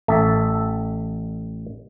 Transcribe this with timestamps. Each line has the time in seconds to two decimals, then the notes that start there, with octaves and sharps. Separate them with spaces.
0.08 A1 A4 E5